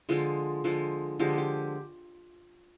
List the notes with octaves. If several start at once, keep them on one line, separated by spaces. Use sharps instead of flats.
D3 F3 G#3 F4
D3 F3 G#3
D3 F3 G#3 G4
G4